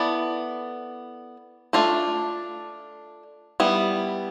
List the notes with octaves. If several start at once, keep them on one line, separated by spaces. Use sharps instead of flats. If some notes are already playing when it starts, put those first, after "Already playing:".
Already playing: B3 E4 A4 D5
A3 D4 F4 A4
G3 B3 E4